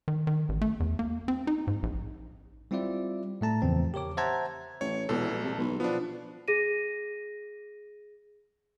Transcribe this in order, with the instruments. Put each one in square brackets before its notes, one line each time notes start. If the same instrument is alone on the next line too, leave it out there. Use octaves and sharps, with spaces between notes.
[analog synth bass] D#3
D#3
A1
A3
E2
A#3
C4
D#4
G#2
A#1
[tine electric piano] G3 C4 E4 F4 D5 E5
A2 A3 A5 A#5
E2 C#3 E3 F3 C4
G4 A#4 C#5 D6
C5 E5 F#5 A5 A#5 G#6
[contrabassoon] A1 [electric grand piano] C#5
[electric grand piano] A#1 A4 [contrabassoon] E2 [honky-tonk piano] B2 G3 G#3
[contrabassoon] C3 [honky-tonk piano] A5
[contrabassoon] B1 [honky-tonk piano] B2 D#3 E3
[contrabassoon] F3 [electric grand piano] B3 D4
[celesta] G#4 A#6 D#7